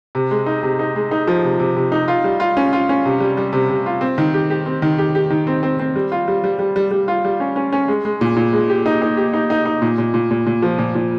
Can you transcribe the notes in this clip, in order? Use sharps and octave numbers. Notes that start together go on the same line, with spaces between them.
C3
G#3
D#4
C3
D#4
G#3
D#4
F3
C3
C3
C3
D#4
F4
G3
F4
C#4
F4
C#4
C3
G3
G3
C3
C3
F4
C4
D#3
G4
G4
C4
D#3
G4
G4
D#3
C4
C4
C4
G3
F4
G3
G3
G3
G3
G3
F4
G3
C#4
C#4
C#4
G#3
G#3
A#2
A#2
G#3
G4
D#4
D#4
G4
D#4
D#4
D#4
A#2
A#2
A#2
A#2
A#2
F3
A#2
A#2